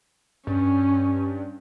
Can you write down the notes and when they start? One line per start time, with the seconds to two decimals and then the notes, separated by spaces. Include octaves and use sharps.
0.47 G2 C#4